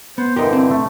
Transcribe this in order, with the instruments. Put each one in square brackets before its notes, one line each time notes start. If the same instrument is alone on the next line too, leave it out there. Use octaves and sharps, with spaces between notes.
[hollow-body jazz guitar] B3 [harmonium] C5
[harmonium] G2 D3 E3 [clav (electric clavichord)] D#4 G4 [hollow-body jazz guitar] A#4 C5
[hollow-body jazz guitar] C4
[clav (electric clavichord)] A3